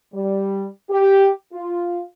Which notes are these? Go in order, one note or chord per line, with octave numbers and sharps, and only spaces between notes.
G3
G4
F4